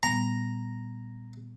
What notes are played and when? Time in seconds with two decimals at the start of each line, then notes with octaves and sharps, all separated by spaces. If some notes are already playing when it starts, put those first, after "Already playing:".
0.03 A#2 G3 B3 A#5